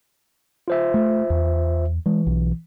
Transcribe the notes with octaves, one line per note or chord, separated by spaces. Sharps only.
F4 C5 E5
A3
E2
E3 G#3
B1